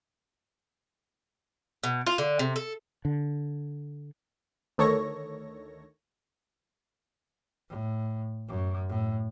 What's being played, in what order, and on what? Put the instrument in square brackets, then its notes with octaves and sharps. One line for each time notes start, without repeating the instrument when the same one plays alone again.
[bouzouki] B2
F4
D3
C3
A4
[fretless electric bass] D3
[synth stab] D2 D#3 A4 C#5 C#6 A#6
[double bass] A2
F#2
A2